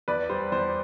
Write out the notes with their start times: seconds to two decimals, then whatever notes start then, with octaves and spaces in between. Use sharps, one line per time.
0.08 E2 B4 D5
0.30 G3 C5
0.52 E2 C5